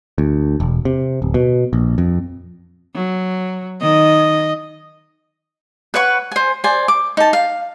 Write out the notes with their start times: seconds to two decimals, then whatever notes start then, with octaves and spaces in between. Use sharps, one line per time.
0.18 D2
0.60 E1
0.85 C3
1.22 D1
1.34 B2
1.73 A#1
1.98 F2
2.94 F#3
3.81 D#3 D#5
5.94 B4 C#5 F#5 C#6
6.32 C5 G#5
6.64 C5 D5 G#5
6.88 D6
7.17 D#4 A5
7.33 F5